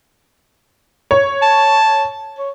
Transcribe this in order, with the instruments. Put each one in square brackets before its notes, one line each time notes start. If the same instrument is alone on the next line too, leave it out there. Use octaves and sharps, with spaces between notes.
[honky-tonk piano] C#5
[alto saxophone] A5
C#5